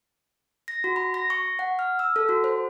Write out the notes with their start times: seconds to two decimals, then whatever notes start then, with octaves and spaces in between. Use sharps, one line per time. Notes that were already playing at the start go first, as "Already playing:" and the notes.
0.68 A#6
0.84 F#4
0.96 B5
1.14 A#6
1.30 C#6
1.59 F#5
1.79 F6
1.99 E6
2.16 A4
2.29 F#4
2.44 C5